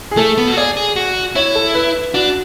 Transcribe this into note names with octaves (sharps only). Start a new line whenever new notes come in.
G#4
A3 A4
B3
F#4
G#4 D5
G#4
F#4
E4 C#5
A4
B4
D4 F#4